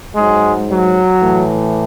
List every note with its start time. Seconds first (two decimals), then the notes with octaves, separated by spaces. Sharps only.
0.15 G#2 F#3 G#3
0.69 F#3
1.20 A2 E3